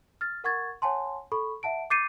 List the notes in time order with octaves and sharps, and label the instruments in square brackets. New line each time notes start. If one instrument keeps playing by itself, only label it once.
[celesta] F6 A6
A#4 F#5 C#6 G#6 A6
C#5 F#5 G#5 A5 C6
A4 B5 C#6
E5 F#5 A5 D7
D6 G6 A6 C7 C#7 D#7